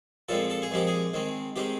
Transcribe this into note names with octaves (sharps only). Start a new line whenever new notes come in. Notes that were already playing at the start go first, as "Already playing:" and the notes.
A#2 F3 G#3 C4 A4
A4
G#4
A#2 F3 G#3 C4 G4
G#4
D#3 G#3 C4
D#3 G#3 C4 G4